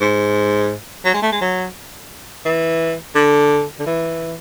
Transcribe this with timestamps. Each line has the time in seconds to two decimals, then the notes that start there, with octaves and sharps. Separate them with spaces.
0.01 G#2
1.05 F#3
1.14 G#3
1.22 A3
1.32 G#3
1.41 F#3
2.45 E3
3.15 D3
3.79 D3
3.86 E3